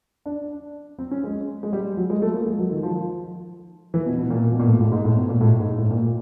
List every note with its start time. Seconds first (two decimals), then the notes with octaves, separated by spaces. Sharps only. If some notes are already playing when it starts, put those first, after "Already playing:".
0.26 D4
0.99 C4
1.11 C#4
1.24 G#3
1.63 G#3
1.73 G3
1.97 F#3
2.10 G#3
2.22 A3
2.34 A#3
2.46 G#3
2.59 F#3
2.71 D#3
2.83 F3
2.95 F3
3.94 E3
4.06 B2
4.18 B2
4.30 A#2
4.52 B2
4.60 A#2
4.67 A2
4.80 A2
4.92 G#2
5.05 A2
5.17 B2
5.29 A#2
5.41 A2
5.60 G#2
5.78 A2
5.91 A#2